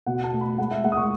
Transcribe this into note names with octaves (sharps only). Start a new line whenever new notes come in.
B2 F#5
A5
A3
B5
G#3 F#5
E5
G#3 F#5
D#6
C#6